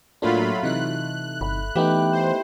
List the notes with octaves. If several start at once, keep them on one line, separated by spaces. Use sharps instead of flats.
A2 F#3 A3 A#3 D4 F4 B5
C3 E3 D#4 F#6
G1 B5
E3 A3 B3 D#4 E4 G4 G5
C5